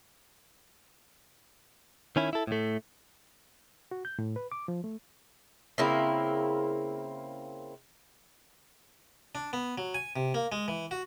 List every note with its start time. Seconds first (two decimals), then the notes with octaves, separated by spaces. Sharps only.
2.16 D#3 C#4 E4
2.33 E4 A4
2.47 A2 A3
3.91 F#4
4.05 G6
4.19 A2
4.36 B4
4.52 D6
4.68 F3
4.84 A3
5.78 C#3 A#3 C4 E4
9.35 D4
9.53 B3
9.78 F#3
9.94 G#5
10.16 C3
10.34 A#3
10.52 G#3
10.68 E3
10.91 F#4